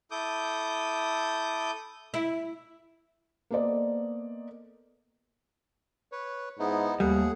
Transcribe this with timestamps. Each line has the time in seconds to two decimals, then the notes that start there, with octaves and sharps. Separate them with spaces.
0.11 E4 A4 D6 D#6 G6
2.14 E4
3.51 A#3 B3 A4 C5 D5 D#5
6.12 B4 C#5
6.59 G#2 B3 D#4 E4
7.00 D#2 G3 A3 G#4 F#5